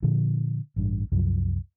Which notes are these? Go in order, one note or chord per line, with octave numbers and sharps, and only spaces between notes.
A#2 D3 F3
A1 G2
C2 F#2 F3